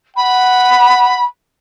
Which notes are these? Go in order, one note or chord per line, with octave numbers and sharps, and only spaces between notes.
F#5 B5